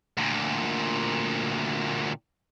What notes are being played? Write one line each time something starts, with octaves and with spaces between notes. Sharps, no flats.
D2 A#2